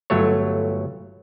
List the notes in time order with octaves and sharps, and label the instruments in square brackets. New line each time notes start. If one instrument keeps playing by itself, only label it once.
[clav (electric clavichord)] G1 F#3 A3 C#5